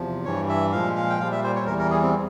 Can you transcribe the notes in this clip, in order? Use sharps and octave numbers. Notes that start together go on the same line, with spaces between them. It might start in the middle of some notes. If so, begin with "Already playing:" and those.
Already playing: E2 C3 F3
G2 E3 G3 C#5
E5
A#2 F3 G#3 F5
F5
G5
A#2 G3 F5
E5
C5
C#5
E2 E3 G3 A#4
A#4
G#4
C4